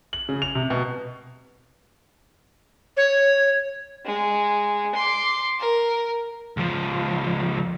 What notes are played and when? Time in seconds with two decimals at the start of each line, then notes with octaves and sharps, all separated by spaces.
0.13 F#7
0.29 C#3
0.42 F7
0.55 C3
0.70 B2
2.97 C#5
4.06 G#3
4.95 C6 D6
5.60 A#4
6.57 C#2 F3